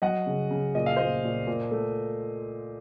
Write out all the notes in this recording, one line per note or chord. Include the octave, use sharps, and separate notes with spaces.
F#3 D#5 F#5
C#3
C#3
A#2 D#5
F5
A#2 C5 D#5
A#2
A#2
A3